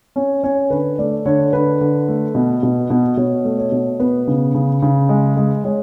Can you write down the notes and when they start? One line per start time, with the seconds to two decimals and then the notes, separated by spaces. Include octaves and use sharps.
0.16 C#4 C#5
0.44 C#4 C#5
0.70 D3 B4
0.98 A3 D5
1.26 D3 C#5
1.53 D3 B4
1.81 D3
2.08 A3
2.35 B2
2.63 B2
2.90 B2
3.17 B2 C#5
3.44 A3
3.59 C#5
3.72 B2
4.00 B3 B4
4.27 C#3
4.54 C#3
4.82 C#3
5.09 G#3
5.36 G#3
5.64 G#3 C#5